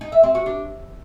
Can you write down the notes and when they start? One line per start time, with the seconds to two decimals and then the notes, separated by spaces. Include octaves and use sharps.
0.01 D#4
0.12 E5
0.24 C4
0.35 F#4
0.46 D4